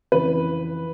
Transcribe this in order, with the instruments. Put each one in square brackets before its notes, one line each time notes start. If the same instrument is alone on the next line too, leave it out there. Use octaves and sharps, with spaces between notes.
[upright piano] F2 C#3 E3 B4